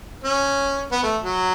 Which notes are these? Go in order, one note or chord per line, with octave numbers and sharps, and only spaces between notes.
C#4
B3
A3
F#3